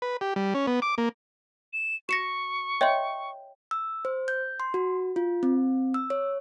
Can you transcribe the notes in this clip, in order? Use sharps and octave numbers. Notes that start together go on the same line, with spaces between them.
B4
G4
G3
C#4
B3
D6
A#3
E7
F#4 C#6 A#6 C#7 E7
C#5 D#5 E5 G5 C6
E6
C5
G6
C6
F#4
F4
C4
E6
C#5